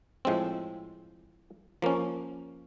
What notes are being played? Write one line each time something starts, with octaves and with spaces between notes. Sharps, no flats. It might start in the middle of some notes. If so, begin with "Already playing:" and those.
A2 F3 G#3 C4
F3 A#3 C#4